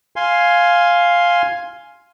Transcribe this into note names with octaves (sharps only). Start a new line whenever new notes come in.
F5 G#5 C6